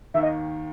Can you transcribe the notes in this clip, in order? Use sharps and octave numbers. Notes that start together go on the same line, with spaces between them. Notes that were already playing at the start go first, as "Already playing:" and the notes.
D#2 D#3 E5
D#5